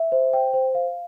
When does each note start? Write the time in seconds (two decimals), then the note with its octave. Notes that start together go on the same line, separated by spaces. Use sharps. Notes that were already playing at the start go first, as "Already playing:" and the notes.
Already playing: E5
0.12 C5
0.33 G5
0.54 C5
0.75 F5